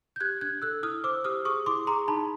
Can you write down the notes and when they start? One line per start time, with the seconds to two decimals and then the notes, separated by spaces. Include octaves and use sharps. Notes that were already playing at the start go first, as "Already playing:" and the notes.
0.16 G6
0.20 G4 F#6 G#6
0.41 D4 F#6 G#6
0.62 A4 E6 F#6
0.83 E4 D#6 F6
1.04 C5 D6 E6
1.24 G4 D#6 F6
1.45 G#4 C#6 D#6
1.66 E4 C6 D6
1.87 G#4 A#5 C6
2.08 D#4 A5 B5